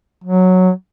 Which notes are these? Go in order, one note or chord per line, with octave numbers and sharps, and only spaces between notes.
F#3